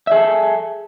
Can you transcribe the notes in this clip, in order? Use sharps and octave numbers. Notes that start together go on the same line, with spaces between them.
G#4 A4 E5